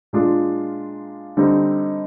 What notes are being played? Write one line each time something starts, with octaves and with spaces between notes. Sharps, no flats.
A#2 G#3 D4 F4
D3 G3 C4 D#4